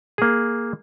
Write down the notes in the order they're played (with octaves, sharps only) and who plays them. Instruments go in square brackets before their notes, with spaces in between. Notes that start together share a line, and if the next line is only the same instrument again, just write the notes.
[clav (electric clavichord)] A#3 G#4